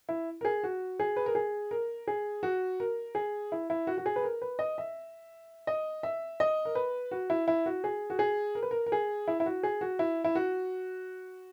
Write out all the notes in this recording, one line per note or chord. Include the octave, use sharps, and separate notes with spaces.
E4
A#4
G#4
F#4
G#4
B4
A#4
G#4
A#4
G#4
F#4
A#4
G#4
E4
E4
F#4
F#4
G#4
B4
A#4
B4
D#5
E5
D#5
E5
D#5
A#4
B4
F#4
E4
E4
F#4
G#4
F#4
G#4
A#4
B4
A#4
A#4
G#4
E4
E4
F#4
G#4
F#4
E4
E4
F#4